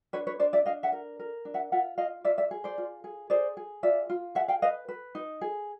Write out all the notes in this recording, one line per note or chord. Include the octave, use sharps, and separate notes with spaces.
D4 B4 C#5
B4 C#5
D4 C5 D5
D5 E5
D4 D#5 F5
E5 F#5
A#4
A#4
D4
E5 F#5
F4 E5 F#5
F4 D#5 F5
F4 D5 E5
D5 E5
G#4
C5 D5
F4
G#4
G#4 C5 D5
G#4
F4 D5 E5
F4
G#4 E5 F#5
F5 G5
B4 D#5 F5
B4
D#4
G#4